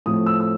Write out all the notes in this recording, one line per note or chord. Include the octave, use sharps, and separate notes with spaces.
A2 F3 A3 C4 D#6
E6
E6